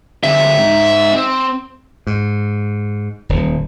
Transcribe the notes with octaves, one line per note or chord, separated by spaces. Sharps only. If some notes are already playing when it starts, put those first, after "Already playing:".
D3 C4 E5
G#2 D#4
C4
G#2
D#1